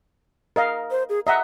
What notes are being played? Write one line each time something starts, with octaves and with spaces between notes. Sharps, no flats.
A#4 D#5 F5
C5
G#4
D#5 E5 F#5 A#5